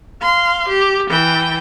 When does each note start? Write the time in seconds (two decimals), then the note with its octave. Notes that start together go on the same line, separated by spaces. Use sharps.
0.22 F5 C6
0.69 G4
1.10 E3 G5